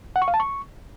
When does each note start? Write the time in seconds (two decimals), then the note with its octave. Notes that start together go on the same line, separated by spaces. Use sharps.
0.16 F#5
0.22 C#6
0.28 F5
0.34 A5
0.40 C#6